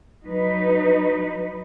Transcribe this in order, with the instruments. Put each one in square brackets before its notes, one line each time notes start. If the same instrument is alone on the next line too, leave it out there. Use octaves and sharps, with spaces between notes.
[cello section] F#3 D#4 B4